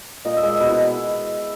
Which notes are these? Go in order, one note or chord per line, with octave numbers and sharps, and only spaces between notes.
A#2 D#5
E5
G#3
D#5
B2 B4
E4